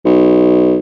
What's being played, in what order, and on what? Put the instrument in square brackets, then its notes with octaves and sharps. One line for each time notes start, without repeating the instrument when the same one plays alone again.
[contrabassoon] B1